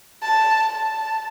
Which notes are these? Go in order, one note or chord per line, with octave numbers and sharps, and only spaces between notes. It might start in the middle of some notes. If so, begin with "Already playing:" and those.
A5
A5